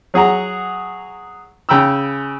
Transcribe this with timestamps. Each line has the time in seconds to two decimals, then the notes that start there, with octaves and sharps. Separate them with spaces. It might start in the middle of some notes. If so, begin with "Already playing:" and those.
0.14 F#3 G#4 F#5 A#5
1.69 C#3 G5 A#5 B5 E6